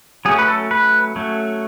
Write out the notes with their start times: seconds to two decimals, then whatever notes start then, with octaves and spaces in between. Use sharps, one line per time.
0.25 F#3 A3 C#4 G#4
0.39 B4
0.48 A4
0.71 B4
1.16 F#3 A3 C#4